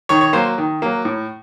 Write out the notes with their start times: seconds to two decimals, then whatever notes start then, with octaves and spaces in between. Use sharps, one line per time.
0.09 D#3 C#5
0.21 C#5
0.33 F#3 A#3 C5
0.58 D#3
0.82 F#3 A#3
1.05 A2